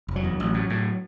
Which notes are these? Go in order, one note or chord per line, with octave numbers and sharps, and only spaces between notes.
F1
F#3
E2
A1
A2
A2